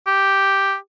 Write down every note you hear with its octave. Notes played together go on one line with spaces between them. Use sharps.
G4